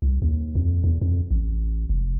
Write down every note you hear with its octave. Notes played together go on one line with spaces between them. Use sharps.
C2
D#2
F2
E2
F2
A1
F1